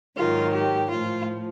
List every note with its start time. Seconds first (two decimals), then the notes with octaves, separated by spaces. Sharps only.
0.18 G#2 D#3 F#3 F4
0.54 G4
0.90 A2 F3 F4